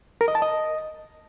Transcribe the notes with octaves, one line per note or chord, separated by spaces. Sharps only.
A#4
D#5
A5
D#5